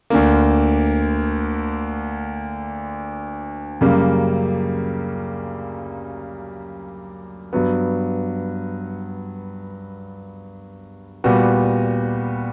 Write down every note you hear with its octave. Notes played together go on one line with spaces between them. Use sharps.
D2 D3 A#3
F#2 C#3 G3 A#3
G2 F#3 B3
A#2 G3 B3 F#4